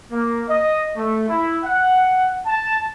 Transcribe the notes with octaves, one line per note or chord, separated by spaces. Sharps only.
A#3
D#5
A3
E4
F#5
A5